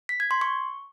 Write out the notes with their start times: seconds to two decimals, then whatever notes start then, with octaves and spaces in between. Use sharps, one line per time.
0.09 B6
0.20 G#6
0.31 C6
0.41 C#6